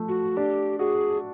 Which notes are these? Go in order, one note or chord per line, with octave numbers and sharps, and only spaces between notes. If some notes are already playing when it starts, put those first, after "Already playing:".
Already playing: F3 A3
F#4
D4 G4
F#4 G#4